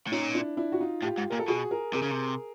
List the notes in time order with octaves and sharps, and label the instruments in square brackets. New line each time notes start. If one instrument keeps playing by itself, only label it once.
[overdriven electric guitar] A2
[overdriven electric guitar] A#2 [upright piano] C#4 D#4
[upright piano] D4 E4
D4 E4
F#4
D#4 F4
[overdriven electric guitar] A2 [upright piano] F4 G4
[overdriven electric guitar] G#2
[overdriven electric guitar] A#2 [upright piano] A#4
[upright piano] A4
[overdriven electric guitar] B2 [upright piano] F#4 G#4
[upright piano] G#4 A#4
[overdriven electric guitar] C3 [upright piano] G#4 A#4
[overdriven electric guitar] C#3
C3